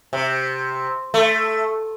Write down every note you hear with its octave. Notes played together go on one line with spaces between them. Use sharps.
C3
A3